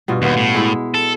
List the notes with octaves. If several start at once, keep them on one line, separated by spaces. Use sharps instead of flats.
G2 B2 F4
D#2 B3 F4
A2
G#3 E4
A4